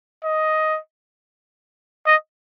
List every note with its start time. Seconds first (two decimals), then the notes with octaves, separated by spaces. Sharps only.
0.25 D#5
2.06 D#5